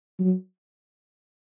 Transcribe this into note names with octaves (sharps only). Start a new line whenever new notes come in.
F#3